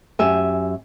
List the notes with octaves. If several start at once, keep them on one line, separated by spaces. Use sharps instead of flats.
F#2 G4 E5 G#5